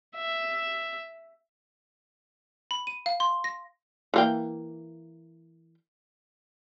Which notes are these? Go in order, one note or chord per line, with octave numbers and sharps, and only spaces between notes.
E5
B5
D#7
F5
C6
A#6
E3 A#3 G5